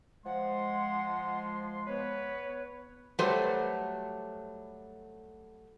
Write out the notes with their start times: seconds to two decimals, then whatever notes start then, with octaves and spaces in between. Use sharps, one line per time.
0.25 F3 G#3 F#5 C6
1.86 B3 B4 C#5
3.19 F#3 G3 A3 A4 B4 C5